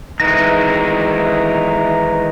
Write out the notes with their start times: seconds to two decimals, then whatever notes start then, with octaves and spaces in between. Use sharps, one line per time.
0.20 D#3 E3 G#3 B4 D#5 A#5 A#6